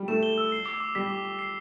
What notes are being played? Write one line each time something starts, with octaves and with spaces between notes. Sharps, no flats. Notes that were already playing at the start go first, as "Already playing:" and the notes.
Already playing: G3
A3 E7
G7
E6
C7
D6
D6
G3 B6
D6
D6
C7